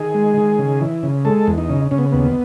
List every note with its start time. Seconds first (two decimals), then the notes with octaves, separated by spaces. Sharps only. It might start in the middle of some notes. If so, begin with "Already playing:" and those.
Already playing: D#3 G#4
0.14 G#3
0.37 D#3
0.59 C#3
0.81 E3
1.03 C#3
1.25 G#3 A4
1.47 E2
1.58 D#4
1.69 C#3
1.91 C#3 C#4
1.98 B3
2.12 D#2 B3